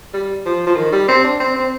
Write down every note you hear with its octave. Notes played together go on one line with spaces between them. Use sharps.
G3
F3
F3
D#3
G3
C4
D4
C4
C4